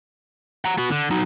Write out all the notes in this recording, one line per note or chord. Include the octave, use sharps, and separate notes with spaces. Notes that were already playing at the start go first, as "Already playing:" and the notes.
F#5 A#5
B3 F#4
D3
F#3 D#4